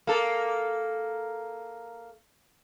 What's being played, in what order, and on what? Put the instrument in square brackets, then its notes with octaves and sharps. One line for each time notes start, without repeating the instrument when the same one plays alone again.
[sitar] A#3 A4